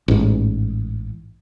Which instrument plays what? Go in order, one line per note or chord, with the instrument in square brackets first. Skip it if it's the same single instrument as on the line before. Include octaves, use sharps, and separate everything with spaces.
[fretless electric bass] A1 G#2